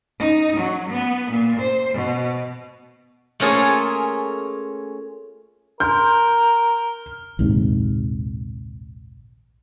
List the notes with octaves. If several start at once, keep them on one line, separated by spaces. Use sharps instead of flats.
D#4
F#3
B3
A#2
C5
B2
A3 A#3 C#4 F4 G#4 G#5
A#4 C6 F6 G6
A#1 D#2 G#2 C3